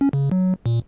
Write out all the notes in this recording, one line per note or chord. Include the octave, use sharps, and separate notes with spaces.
C#4
C#3
F#3
A#2